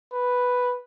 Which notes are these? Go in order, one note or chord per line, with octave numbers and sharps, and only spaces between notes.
B4